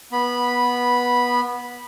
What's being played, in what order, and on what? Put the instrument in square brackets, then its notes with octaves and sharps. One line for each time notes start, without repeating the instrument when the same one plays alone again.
[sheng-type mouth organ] B3 B5